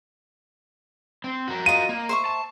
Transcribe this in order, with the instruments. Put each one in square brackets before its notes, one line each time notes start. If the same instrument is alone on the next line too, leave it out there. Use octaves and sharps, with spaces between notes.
[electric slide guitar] C4
F#4 A#4
[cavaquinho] F4 D#5 [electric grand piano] D#7
[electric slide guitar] A#3
[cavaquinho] C5 E5 C#6
[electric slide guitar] A5